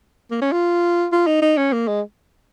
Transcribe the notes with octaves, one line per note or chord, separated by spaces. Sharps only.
A#3
C#4
F4
F4
D#4
D#4
C#4
A#3
G#3